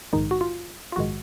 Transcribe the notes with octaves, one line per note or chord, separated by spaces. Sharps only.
A#1 G#2 D#3 G#3 D#4
F#4
F4
F4
A#1 G#2 D#3 G#3 F#4